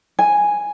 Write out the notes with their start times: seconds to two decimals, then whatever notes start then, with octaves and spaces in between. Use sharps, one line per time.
0.19 G#5